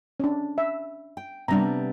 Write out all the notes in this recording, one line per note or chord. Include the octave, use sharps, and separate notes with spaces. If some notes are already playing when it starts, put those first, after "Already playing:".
C#4 D4
E5
G5
C3 G3 B3 D4 A#5